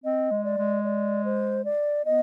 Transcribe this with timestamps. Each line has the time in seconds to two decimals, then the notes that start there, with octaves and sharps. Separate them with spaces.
0.04 C4 D#5
0.31 G#3
0.44 D5
0.58 G#3
0.84 D5
1.25 C5
1.65 D5
2.05 B3 D#5